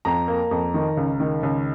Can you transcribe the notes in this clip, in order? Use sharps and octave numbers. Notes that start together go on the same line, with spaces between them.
F2 A#5
A#3
F2
D#3
C#2
D#3
C#2